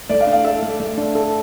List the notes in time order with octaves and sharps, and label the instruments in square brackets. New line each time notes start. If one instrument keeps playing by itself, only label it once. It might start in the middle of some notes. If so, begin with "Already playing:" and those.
[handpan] A3 [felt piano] D5
[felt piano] F5
[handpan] D4
[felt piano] F5
[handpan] A4 [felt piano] E5
[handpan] A3
A3
D4
A4